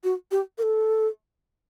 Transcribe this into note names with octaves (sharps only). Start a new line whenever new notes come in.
F#4
G4
A#4
A4